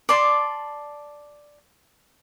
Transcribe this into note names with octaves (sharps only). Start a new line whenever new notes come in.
D5 A5 C6